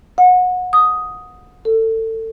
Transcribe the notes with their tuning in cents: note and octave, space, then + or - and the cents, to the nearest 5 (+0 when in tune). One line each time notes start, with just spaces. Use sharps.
F#5 -25
D#6 +5
A4 +25